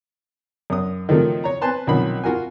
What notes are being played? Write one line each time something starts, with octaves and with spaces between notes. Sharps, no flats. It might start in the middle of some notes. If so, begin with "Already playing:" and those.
F#2 D#6
D#3 F3 F#3 A3 A#3 C4
C#5 A#5
B4 C5 G#5 A5 C6
B1 C3 D#3 F3 C#4 B5
F4 F#4 A#4 G#5